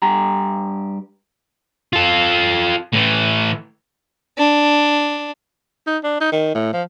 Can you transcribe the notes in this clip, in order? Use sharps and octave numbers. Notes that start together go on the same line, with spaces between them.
G2 G4 A#5
F4 A4
A2 E3
D4
D#4
D4
D#4
D#3
A2
F3